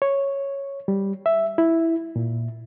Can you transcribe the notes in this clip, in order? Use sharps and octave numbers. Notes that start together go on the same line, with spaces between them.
C#5
G3
E5
E4
A#2